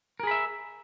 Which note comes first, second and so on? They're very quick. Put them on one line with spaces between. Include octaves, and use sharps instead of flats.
A#4 G#4 B5 E5